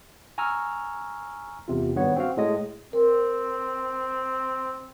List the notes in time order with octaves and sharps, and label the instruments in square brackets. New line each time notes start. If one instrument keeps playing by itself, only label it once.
[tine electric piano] G#5 A#5 C#6 E6 F6
E2 C3 F4
G#1 G2 B3 C#5
C4 F#4 F5
A2 G#3 D#5
[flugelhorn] C4 [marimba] A#4